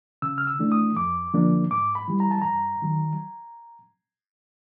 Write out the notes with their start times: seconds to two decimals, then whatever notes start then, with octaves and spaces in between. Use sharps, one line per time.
0.22 C#3 E6
0.38 F6
0.47 E6
0.59 E3 A3 D4
0.72 D#6
0.96 F2 D6
1.34 D3 F3 A#3 D4
1.71 G#2 D6
1.95 B5
2.08 E3 G3
2.20 A#5
2.31 A5
2.42 G2 A#5
2.82 D#3 F#3